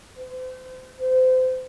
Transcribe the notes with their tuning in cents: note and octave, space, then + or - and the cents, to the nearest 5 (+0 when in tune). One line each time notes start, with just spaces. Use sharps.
C5 -40
C5 -30